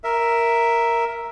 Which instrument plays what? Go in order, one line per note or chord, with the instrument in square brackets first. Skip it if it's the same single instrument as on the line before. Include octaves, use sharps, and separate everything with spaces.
[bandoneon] A#4 E5